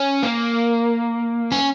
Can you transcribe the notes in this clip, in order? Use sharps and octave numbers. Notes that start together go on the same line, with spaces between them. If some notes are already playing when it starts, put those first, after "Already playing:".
Already playing: C#4
A#3
C#4